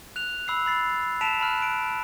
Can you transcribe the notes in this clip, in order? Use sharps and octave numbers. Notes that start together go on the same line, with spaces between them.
F#6 F7
B5 E6 F#6 C7
B5 A6 C7
A5 B6 C7 D7 E7 F7
A5 B5 F6 F#6
F#6 D7